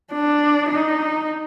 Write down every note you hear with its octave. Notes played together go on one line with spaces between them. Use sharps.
D4
D#4